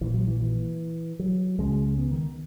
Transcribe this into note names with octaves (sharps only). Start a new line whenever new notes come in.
A#1 A#2 E3
F#3
E3
E3
F#3
C#2 C#3 G#3
B3
D#3